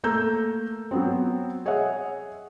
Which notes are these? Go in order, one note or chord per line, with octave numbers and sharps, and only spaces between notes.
A3 A#3 A4 A#5 E6 G6
F#3 B3 C4
G#4 C#5 D#5 E5 F#5